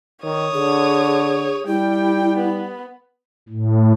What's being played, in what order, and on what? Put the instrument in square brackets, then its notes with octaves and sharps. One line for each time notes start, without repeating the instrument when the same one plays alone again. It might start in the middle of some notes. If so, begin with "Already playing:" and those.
[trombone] D#3 [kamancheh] C#5 D#6
[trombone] D3 [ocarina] G#4
[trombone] G3 [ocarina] E4 [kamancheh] G5
[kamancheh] B3
[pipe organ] A2